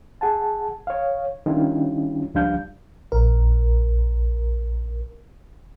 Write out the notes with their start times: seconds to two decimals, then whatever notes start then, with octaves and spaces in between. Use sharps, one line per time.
0.21 G#4 F#5 A5
0.87 C#5 F5
1.46 D#3 G3 C#4 D4 E4 F4
2.34 C#2 F3 G3 D4 F5 G6
3.12 A#1 A#4